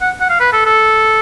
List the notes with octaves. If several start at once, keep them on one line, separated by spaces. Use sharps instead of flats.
F#5
F#5
F5
B4
A4
A4